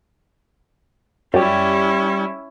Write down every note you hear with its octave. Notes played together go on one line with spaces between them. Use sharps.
F#2 G3 C#4 E4 G4